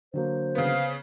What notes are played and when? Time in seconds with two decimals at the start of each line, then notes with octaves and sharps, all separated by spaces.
0.14 D3 F#3 A#3 C5
0.55 C#3 B3 F5